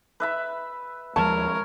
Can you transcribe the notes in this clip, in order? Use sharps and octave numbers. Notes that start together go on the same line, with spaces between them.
B4 E5 B5
D#2 F3 G#3 A#4 C#5 A5